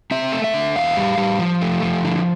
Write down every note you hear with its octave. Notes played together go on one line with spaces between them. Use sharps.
C4 E5
A3
E5
D3
E2 F5
G3
G3
F3
A3
F3
D3